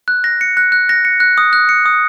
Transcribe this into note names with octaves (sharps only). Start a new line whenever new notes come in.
F#6
A#6
C#7
F#6
F#6
A#6
C#7
F#6
D#6
F#6
C#7
D#6